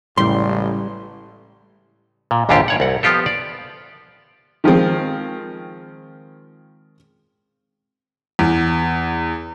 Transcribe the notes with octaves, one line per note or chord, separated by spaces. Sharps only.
A1 A2 C#3 G3 G#3 C6
A#2
A#1 D#2 G#2 D3 F4 G4
G2 C#5 F#5
C2 F#5
F3 B3 F4 G4 A4
D5
D#3 F3 G#3 C4
E2